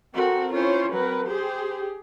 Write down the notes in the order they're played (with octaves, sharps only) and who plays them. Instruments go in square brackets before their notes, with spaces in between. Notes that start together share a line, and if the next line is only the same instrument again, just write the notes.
[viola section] C4 A4 A#4 [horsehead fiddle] F#4
[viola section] C#4 E4 C#5 [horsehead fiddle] F4 C5
[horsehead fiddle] F#3 C4 [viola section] A#4 B4
[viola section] G4 G#4 [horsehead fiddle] C5